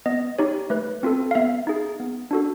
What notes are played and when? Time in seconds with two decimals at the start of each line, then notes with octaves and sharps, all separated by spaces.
0.06 B3 D#5
0.39 D#4 G4 C#5
0.70 A3 B4
1.03 C4 F4 A4
1.31 F5
1.35 B3 E5
1.67 D#4 G#4
2.00 B3
2.31 D4 F#4 A4